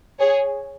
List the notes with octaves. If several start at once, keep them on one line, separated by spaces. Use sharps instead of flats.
G#4 C#5